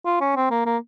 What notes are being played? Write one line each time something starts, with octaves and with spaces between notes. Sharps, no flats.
F4
C#4
C4
A#3
A#3